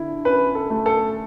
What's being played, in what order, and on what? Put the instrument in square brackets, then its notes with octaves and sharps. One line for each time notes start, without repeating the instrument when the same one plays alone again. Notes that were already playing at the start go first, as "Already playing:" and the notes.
Already playing: [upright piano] D3 E4
[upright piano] C#4 [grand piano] B4
[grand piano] A4
[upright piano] A3
[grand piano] A4